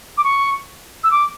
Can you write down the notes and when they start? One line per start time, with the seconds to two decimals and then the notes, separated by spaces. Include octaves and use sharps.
0.17 D6
0.24 C#6
1.03 E6
1.11 D6